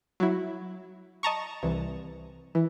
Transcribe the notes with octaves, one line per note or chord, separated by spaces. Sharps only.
F#3 E4
D#5 A5 A#5 C#6
C2 E3
E3